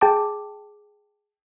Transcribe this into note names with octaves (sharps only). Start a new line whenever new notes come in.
G#4 G5 A5 D6